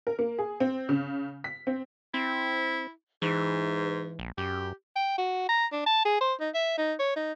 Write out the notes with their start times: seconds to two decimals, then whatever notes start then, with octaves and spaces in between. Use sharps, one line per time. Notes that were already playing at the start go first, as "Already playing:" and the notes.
0.07 A#4
0.19 A#3
0.39 G#4
0.60 C4
0.89 C#3
1.44 B6
1.67 C4
2.14 C4 E4
3.22 G#2 E3
4.19 A#1
4.38 F#2 G4
4.96 G5
5.18 F#4
5.49 A#5
5.72 D4
5.86 A5
6.05 G#4
6.21 C5
6.41 D#4
6.54 E5
6.78 D#4
6.99 C#5
7.16 D#4